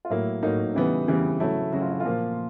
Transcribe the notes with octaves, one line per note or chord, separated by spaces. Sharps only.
F4
A2 F#3 A#3 E4
A2 F#3 A#3 D#4
C#3 E3 G3 B3
C#3 E3 G3 B3
C#3 F#3 A3 E4
C#3 F#3 A3 F#4
F4
E4
F4
A#2 F3 A#3